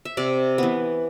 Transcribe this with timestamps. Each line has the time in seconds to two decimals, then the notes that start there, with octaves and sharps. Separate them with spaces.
0.05 E5
0.17 C3 D5
0.58 E3 B3